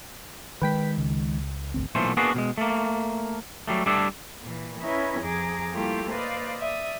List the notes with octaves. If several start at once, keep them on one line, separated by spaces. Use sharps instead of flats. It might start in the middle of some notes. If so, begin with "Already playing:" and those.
D#3 G#3 B4 G5 B6
C#2
G#1 D2 C4
B1 A#2 E3 A3 C5
A#3 B3 D4 F#4 G#4 B4
B2 F#3 G#3
A3 A#3
F#3 G3 A3
G3 A3 D4 E4 A4
A#2 E3
C#4 E4 B4 D#5 E5 A#5
F2 F3 G#4 A#5 D6
G3 A3 A#3 E4 F4 G4
A#3 B4 C5 D5 D#5 F5
D5 E5 D#6